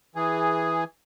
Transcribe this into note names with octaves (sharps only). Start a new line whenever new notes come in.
E3 G#4